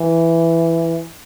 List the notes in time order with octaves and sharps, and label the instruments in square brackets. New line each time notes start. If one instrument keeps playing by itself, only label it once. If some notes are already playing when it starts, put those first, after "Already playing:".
Already playing: [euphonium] E3